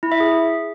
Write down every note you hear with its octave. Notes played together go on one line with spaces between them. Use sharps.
E4
E5
G#4